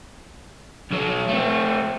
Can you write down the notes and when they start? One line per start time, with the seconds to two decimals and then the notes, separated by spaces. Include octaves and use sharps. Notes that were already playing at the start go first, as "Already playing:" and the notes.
0.91 B1 F#3
1.29 A3 C4